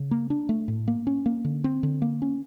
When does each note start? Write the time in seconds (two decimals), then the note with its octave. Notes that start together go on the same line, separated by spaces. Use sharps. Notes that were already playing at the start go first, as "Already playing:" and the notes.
Already playing: C#3
0.11 A#3
0.30 D4
0.49 A3
0.68 A2
0.88 A#3
1.07 C#4
1.26 A#3
1.45 D3
1.64 C4
1.83 D3
2.02 A#3
2.22 C#4